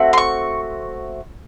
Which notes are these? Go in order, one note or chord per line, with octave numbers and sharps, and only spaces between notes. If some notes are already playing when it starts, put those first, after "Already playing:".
Already playing: A3 C4 F#4
C6
C#6